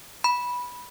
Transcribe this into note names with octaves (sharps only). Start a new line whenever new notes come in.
B5